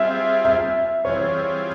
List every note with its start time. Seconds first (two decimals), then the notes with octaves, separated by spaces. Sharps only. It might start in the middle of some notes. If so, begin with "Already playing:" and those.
Already playing: G3 C4 F4 G#4 E5
0.45 E5
1.05 E3 G3 C4 F4 G#4 C#5